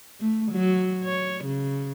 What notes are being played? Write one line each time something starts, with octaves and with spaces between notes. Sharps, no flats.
A3
F#3
C#5
C#3